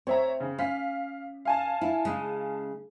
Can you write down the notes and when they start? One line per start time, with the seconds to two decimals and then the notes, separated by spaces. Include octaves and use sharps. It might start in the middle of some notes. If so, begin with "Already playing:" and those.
0.07 C4 C#5 E5 A#5
0.40 C#3
0.58 C#4 F5 B6
1.45 F5 G#5 A5
1.81 E4
2.05 C#3 G#3